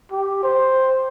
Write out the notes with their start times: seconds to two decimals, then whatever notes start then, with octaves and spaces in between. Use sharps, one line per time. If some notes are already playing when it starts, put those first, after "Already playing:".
0.12 G4
0.43 C5